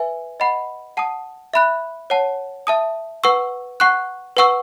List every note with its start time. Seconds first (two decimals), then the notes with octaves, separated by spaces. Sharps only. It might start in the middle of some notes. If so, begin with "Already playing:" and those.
Already playing: B4 E5 G#5
0.40 D#5 F#5 B5
0.97 F#5 A5 D#6
1.54 E5 B5 F#6
2.10 C#5 F#5 A5
2.67 E5 A5 D#6
3.24 B4 F#5 C#6 E6
3.80 F#5 C#6 F#6
4.37 B4 F#5 C#6 E6